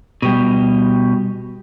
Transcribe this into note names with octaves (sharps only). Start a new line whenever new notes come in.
B2 G3